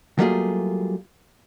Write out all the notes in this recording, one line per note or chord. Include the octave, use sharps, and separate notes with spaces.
F#3 G3 A3 A#3 F4 G#4